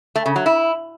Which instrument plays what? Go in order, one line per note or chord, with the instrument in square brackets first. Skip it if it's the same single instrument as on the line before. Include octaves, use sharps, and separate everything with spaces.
[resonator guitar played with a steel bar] A3
C#3
F#3
E4